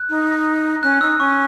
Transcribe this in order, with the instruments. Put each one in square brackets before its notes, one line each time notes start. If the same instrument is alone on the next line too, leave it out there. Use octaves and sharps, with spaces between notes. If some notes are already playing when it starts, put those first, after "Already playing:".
Already playing: [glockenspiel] F#6
[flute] D#4
[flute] C#4 [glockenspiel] F#6
[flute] D#4 [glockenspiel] E6
[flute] C#4 [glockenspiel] C#6